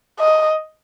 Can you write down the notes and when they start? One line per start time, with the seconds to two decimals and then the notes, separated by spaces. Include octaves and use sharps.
0.20 D#5